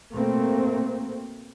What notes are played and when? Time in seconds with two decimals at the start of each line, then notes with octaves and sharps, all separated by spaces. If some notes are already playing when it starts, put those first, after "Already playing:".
0.13 B2 A3 A#3 C4